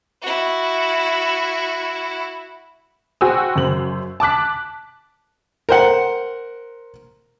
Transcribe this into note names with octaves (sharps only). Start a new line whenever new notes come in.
E4 F#4
F#4 G#4 C5 G5 G#5 E6
F#2 C#3 C5 F#7
A5 D6 F#6 B6
A#4 C5 F#5